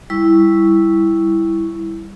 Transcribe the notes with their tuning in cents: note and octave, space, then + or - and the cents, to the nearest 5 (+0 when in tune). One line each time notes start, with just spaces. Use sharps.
G3 +10 E4 +0 C#6 +0